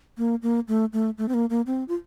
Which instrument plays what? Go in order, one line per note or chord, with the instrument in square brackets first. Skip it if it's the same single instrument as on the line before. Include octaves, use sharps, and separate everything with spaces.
[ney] A#3
A#3
A3
A3
A3
C4
A#3
A#3
C4
F4